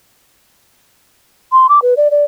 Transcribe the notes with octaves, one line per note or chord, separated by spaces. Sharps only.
C6
D6
B4
D5
D5